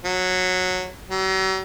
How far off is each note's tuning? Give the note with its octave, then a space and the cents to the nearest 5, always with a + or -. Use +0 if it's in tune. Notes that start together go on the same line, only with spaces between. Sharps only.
F#3 -10
F#3 +45